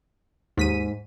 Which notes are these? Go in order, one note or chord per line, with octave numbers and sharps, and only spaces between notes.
D#2 G#2 B6 D#7